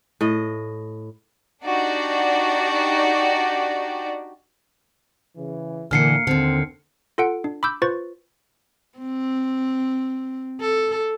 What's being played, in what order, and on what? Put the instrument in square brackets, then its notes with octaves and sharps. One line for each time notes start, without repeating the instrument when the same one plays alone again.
[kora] A2 D#5
[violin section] D4 D#4 F#4 G4 D5
[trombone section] C#3 E3
[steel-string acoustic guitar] A#2 D3 E3 [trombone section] A#3 [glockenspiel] F6 C7 C#7
[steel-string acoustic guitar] D#2 D3 [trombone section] C4
[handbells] F4 A4 F#5 D7
D4
B5 D6 E6 G6
F4 B4 C5 C#6 A6
[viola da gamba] C4
A4